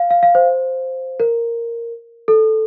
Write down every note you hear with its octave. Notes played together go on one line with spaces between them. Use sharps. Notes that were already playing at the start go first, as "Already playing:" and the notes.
Already playing: F5
F5
F5
C5
A#4
A4